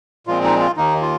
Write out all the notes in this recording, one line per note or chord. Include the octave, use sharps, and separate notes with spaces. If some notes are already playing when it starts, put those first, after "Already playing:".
A#2 F3 G#3 C4 F4
D#4
F4
D#2 D#3 A#3 D#4
F4